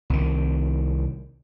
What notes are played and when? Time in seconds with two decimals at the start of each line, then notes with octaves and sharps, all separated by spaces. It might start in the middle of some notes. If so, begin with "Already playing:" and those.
0.10 C2 D#3